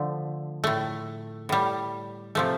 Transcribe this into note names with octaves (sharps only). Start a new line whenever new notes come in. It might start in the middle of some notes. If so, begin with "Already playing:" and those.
Already playing: D3 F3 A3
A2 A3
A2 G3
C3 F3 A3